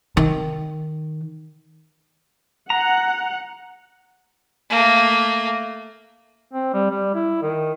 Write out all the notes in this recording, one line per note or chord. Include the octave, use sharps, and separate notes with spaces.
D#3
F#5 A#5
A3 A#3
C4
G3
G3
E4
D#3